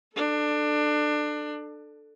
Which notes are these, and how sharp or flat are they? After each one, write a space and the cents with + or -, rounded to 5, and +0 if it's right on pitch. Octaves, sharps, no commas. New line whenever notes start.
D4 +20 A4 +0